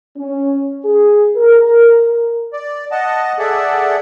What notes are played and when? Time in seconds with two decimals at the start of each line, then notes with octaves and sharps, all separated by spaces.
0.17 C#4
0.85 G#4
1.36 A#4
2.53 D5
2.91 D#5 F#5 A5
3.39 G#4 A4 D5 E5 F#5